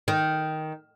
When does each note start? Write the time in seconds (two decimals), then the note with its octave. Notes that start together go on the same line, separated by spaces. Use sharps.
0.08 D#3